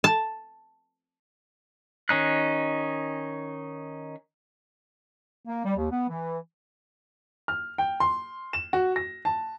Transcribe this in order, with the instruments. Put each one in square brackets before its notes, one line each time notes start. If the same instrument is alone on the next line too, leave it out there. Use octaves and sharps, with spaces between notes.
[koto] A5
[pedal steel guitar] D#3 C#4 D#4 F#6
[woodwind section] A#3
G3
D#2
B3
E3
[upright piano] F6
G5
C6
E7
F#4
A#6
A5